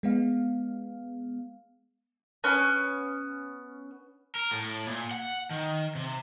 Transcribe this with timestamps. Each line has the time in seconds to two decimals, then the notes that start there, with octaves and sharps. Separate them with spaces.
0.03 G#3 B3 F5
2.44 B3 C#4
4.35 A#4
4.52 A2
4.87 A#2
5.11 F#5
5.51 D#3
5.95 C3